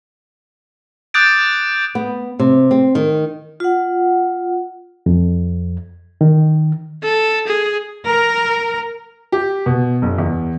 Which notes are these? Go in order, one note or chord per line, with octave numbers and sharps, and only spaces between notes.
D6 D#6 F#6 G6 A6 D7
B3
C3
C4
D#3
F4 F#5
F2
D#3
A4
G#4
A#4
G4
B2
F#1
E2